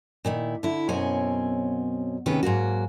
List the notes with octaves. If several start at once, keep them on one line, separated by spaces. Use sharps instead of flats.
A#2 D#3 E4
D3 E4
F#2 B2 C4 C#5 G#5
D#2 C3 D#3 C#4 G#4 B4
G#2 F#3 A#3 F#4